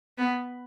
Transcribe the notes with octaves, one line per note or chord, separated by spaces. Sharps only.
B3